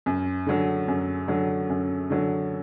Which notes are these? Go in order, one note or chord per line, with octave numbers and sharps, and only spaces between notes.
F#2
D3 F#3
F#2
D3 F#3
F#2
D3 F#3